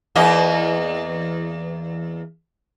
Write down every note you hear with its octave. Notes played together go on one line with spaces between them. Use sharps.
E2 A#3 D#5